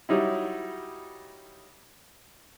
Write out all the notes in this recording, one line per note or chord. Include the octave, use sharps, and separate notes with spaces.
F#3 G3 D#4 E4